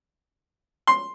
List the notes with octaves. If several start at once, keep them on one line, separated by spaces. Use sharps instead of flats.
C6